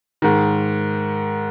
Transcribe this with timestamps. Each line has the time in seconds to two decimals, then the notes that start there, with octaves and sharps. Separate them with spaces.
0.22 G#2 D#3